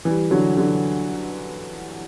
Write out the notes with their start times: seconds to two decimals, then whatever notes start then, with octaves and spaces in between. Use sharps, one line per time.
0.05 E3 G3
0.31 D3 F#3
0.57 D3 F#3